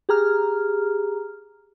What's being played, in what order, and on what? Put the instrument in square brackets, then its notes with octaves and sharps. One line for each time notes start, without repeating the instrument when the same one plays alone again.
[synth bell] G4 G#4 A#5 F6